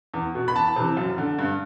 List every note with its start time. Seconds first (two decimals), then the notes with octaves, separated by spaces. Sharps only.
0.14 E2
0.35 B2
0.48 B5
0.56 E2 A5
0.76 C3 E3
0.97 F#2
1.18 D3
1.39 G2